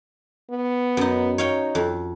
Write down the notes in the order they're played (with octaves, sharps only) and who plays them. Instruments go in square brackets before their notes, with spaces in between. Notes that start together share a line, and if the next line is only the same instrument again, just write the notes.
[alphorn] B3
[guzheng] F#2 D#4
[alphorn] D#4 [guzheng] C#5 F5 G5
[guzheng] F2